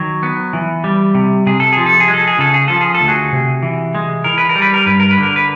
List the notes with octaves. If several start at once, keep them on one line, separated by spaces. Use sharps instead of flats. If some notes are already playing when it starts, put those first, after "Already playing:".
Already playing: D#3 F#3
B3
E3
G3
C3
C3 G#4
A4
F3 G#4
A4
G#4
G#3
A4
G#4
C#3 A4
G#4
F3 A4
G#4
A4
D2
F#4 G#4
C3
E3
G#3
E3 A#4
B4
A#4
G3
B4
A#4
G2 B4
A#4
B4
D3
A#4
B4